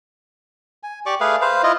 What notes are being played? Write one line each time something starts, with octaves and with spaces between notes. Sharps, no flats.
G#5
G4 D5 C#6 D6
A3 G#4 B4 F5
B4 C5 F5
E4 F4 D#5